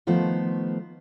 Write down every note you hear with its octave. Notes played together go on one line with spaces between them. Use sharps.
D#3 F3 A3 B3 C5